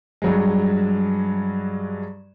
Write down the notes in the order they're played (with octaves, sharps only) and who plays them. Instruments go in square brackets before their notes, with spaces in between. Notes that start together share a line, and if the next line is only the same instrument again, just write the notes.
[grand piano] G2 F#3 G#3